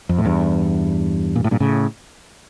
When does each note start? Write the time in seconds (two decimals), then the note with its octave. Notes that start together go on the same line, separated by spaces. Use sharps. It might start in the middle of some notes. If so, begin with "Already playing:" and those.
0.09 F2
0.18 A2
0.25 E2 G2
1.36 A#2
1.44 A2
1.51 G2 A#2
1.60 A2 C#3